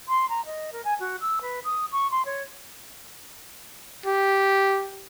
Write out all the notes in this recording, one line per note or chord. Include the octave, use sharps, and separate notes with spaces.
C6
A#5
D#5
A#4
G#5
F#4
E6
B4
D#6
C#6
C6
C#5
G4